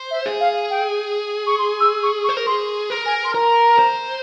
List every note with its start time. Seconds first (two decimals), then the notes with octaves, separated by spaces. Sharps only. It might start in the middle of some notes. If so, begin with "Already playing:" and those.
Already playing: C5
0.11 E5
0.26 G#4
0.40 F5
0.70 G5
1.47 C#6
1.58 C6
1.80 E6
2.03 C#6
2.24 C#6
2.29 C5
2.37 A#4
2.47 G#4 C6
2.90 A#4
3.06 G#5
3.24 C6
3.34 A#4 A#5
3.79 C5